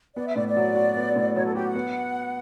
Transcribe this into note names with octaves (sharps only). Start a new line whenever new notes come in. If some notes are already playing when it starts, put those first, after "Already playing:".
B3 D5
E5
A2 D5
D5
F#3
F#4
B3
A2
F#3 C#5
A4
F#4 G4
F#5
B3